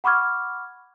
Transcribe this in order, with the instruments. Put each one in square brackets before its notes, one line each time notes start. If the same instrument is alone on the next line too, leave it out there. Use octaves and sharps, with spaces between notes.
[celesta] F#5 B5 C#6 D6 F6 G#6